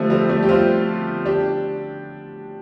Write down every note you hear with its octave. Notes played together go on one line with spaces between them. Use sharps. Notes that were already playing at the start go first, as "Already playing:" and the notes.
Already playing: D3 F3 G3 A3
G3 C4
A3 D4
G4
C4 F4
D4 G4